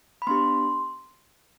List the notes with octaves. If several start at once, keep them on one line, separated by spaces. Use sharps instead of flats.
B5
B3 D4 G4 C6